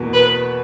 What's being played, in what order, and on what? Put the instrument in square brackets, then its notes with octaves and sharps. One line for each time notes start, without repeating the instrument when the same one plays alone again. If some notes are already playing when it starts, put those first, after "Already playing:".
Already playing: [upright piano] E2 B2 A#3
[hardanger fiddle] B4